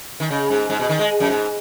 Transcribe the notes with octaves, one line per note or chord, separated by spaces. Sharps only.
D#3
C#3
G#2
G#2
B2
D#3
G#3
F#2
G#2